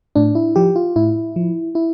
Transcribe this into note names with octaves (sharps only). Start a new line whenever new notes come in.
A2 D4
E4
F3 G4
F4
A2 E4
F3
E4